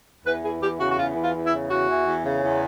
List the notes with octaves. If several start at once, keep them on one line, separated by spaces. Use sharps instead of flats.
E2 B4
E3 G#4
E2 G4
C#3 F#4
F#4
E2 F4
E3
F4
E2
E4
C#3
E2 F#4
E3
E2
C#3
E2